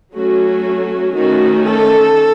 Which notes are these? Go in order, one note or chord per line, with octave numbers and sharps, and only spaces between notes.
F#3 A3 C#4 F#4
D#3 A3 C#4 F#4
A4